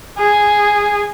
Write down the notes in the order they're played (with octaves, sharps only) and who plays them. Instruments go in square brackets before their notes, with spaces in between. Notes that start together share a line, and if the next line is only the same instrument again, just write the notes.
[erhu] G#4